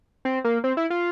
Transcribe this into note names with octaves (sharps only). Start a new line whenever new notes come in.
C4
A#3
C4
E4
F4